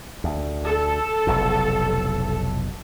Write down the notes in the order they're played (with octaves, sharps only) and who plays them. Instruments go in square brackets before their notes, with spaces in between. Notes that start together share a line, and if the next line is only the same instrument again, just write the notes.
[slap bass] D2
[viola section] A4
[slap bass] F1 B1 A2